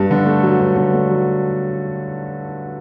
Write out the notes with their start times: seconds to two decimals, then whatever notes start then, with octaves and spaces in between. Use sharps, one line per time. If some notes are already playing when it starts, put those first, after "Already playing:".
Already playing: G2
0.11 D3
0.26 A3
0.43 F#3
0.59 G2
0.76 D3
0.93 A3
1.09 F#3